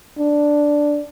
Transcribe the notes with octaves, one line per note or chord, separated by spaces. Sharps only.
D4